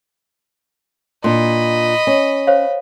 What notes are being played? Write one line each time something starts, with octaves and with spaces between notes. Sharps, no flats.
A#2 D4 D#5 B5 C6
C#4
C5 C#5 F5